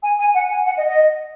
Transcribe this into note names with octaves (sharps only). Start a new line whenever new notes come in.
G#5
G#5
F#5
G#5
F#5
D#5
D#5